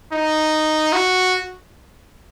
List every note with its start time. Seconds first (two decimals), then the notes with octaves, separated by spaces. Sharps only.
0.12 D#4
0.93 F#4